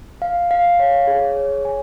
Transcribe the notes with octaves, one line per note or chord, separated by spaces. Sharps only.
F5
F5
C#5
G#4
C#5
G#5